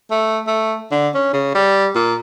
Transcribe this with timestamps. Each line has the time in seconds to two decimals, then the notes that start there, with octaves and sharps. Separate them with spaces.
0.11 A3
0.47 A3
0.91 D3
1.15 C#4
1.33 C#3
1.55 G3
1.95 A#2